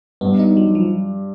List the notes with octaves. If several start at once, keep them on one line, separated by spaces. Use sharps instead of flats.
G2 B3
D#4
F#3
F3